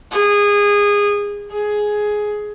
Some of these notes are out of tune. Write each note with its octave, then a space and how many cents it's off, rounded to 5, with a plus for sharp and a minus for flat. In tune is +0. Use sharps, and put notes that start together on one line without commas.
G#4 -20
G#4 +10